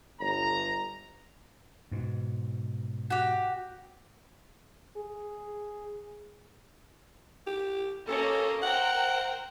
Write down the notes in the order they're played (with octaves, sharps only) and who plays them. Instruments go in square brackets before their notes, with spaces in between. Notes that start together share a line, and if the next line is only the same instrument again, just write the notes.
[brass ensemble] G1 A#5
[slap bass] G#2 B2
[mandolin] F#4 G4
[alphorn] G#4
[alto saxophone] G4
[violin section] A#3 C#4 D#5 [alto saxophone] A4
[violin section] A#4 C5 G5 [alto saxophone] F#5